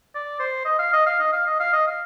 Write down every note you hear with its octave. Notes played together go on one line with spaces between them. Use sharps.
D5
C5
D#5
F5
D#5
F5
D#5
F5
D#5
F5
D#5
F5